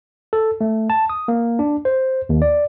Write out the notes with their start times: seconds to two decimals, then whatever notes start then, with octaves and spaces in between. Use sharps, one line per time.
0.33 A4
0.61 A3
0.90 A5
1.10 D#6
1.28 A#3
1.59 D4
1.85 C5
2.29 D#2
2.42 D5